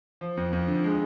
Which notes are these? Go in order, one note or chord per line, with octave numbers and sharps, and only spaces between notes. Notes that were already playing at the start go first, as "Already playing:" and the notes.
F3
F2
F2
D3
G#3